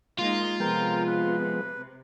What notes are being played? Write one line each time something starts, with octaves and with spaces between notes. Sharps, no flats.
G#3 A#3 D#4 F4
C3 F3 G#3 B3 A#4 G5
B4